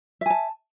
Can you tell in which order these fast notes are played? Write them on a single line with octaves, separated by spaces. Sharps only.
E5 G#5 A5